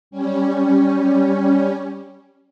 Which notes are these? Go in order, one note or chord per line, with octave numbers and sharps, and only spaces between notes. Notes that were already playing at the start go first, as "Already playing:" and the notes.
G3 C#4